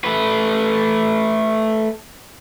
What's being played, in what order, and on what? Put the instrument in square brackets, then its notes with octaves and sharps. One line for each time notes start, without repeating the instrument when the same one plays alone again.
[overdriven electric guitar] A3 B4